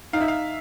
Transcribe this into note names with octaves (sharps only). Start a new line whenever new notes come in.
D#4 F5
E5
F5